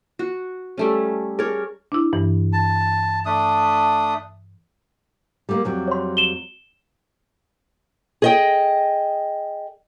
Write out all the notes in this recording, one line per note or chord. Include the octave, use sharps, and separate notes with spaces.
F#4
G3 A3 C#4
G#4 A#4 C#5
D4 E4
G2 E3
A5
A3 D4 D#6
G3 A3 A#3
F2 F#3 G3
C#5 C6
E7 G7
G#4 D#5 G5